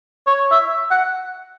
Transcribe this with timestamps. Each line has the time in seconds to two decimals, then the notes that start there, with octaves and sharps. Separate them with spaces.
0.27 C#5
0.51 E5
0.91 F#5